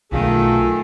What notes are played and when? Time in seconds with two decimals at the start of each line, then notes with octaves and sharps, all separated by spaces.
0.12 B1 D#3 A3 F4 G#4 A4